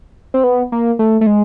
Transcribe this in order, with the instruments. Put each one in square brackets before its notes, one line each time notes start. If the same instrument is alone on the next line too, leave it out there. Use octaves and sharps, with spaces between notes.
[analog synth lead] C4
B3
A#3
A3
A3
G#3